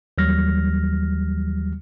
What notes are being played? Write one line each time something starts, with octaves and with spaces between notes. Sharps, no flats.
D#2 E3 F#3 G3 F6 A#6